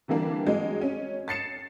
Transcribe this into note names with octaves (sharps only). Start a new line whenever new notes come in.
D3 E3 G3 A#3 D4
F#3 G#3
C#4
A6 C7 C#7 E7